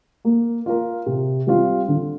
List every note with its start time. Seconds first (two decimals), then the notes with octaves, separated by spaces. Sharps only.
0.25 A#3
0.66 F4 A#4
1.06 C3
1.47 G3 C4 F4
1.88 D3